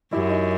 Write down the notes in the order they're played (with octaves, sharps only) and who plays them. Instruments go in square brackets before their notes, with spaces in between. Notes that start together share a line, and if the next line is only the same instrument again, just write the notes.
[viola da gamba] F#2 [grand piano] E4 G4
[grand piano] D#4 F#4